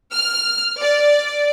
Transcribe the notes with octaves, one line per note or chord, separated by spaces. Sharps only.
F6
D5